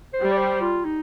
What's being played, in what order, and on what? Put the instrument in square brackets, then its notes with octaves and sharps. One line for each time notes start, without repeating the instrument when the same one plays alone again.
[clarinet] C5
[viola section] G3
[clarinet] D5
C5
F4
D#4